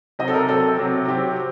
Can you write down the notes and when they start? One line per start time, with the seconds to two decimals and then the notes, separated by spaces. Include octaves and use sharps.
0.19 C3 F#3 C4 D#5
0.28 A4
0.34 A#4
0.49 C3 F#3 C4 A4
0.78 C3 F#3 C4
1.08 C3 F#3 C4 G4